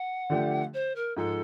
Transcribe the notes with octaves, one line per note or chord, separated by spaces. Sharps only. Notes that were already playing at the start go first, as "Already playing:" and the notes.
Already playing: F#5
D3 F3 A3 D4 G4
C5
A#4
G#2 F3 G#3 A4